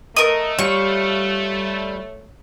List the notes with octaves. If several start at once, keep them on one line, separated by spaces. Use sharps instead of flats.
A3 A#4 D#5 D#6
G3 F4 C#5 C#6